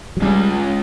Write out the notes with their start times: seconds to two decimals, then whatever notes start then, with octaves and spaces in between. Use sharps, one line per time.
0.17 F#3
0.22 G3 G#3 C#4 F4 G#4